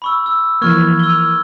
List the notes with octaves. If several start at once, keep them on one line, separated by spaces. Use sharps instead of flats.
B5 C#6 E6
E6
E3 F3 A#3 C#6 F6 G#6
E6 G7